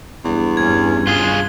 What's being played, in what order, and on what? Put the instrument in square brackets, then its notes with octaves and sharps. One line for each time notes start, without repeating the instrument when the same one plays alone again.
[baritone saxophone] E2 [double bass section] G2
[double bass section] G2 C#4 [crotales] G#6
[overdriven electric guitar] F4 G#4 [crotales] G7